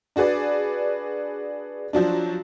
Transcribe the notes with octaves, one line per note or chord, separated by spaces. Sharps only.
D4 F#4 G#4 B4 D5
F3 F#3 D4